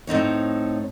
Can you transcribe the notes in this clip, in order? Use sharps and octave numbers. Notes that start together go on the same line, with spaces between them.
A2 C4 D#4 C#5